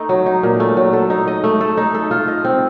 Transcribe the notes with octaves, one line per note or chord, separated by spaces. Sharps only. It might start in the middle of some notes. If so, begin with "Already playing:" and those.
Already playing: A3 D#4
F#3
D#4
A#2
A3
F#3
A4
D#4
D#5
A3
A4
D#4
A4
F4
D#5
C4